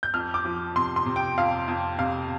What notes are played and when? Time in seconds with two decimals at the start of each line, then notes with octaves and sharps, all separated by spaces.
0.03 G6
0.14 F2 F6
0.34 D6
0.45 F3
0.76 C3 C6
0.96 C6
1.06 C3
1.16 G5
1.38 F2 F5
1.68 F2
1.98 C3 F5